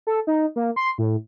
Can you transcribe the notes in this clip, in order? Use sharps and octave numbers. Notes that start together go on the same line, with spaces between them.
A4
D#4
A#3
C6
A2